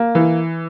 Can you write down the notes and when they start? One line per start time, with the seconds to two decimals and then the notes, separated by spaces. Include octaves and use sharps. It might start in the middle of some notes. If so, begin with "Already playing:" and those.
Already playing: A#3
0.15 E3